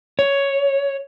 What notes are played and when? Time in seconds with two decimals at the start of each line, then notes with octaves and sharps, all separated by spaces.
0.19 C#5